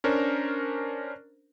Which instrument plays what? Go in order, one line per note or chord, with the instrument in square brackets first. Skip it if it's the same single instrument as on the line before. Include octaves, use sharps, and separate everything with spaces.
[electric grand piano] C#4 D4 A#4 C5